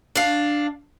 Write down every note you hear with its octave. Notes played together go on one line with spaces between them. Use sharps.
D4 F5